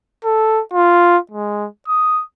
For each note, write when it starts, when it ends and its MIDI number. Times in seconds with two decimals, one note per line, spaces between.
0.25 0.60 69
0.73 1.18 65
1.32 1.67 56
1.88 2.22 87